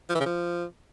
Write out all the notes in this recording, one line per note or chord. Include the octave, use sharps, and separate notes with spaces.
F3
E3
C#3
F3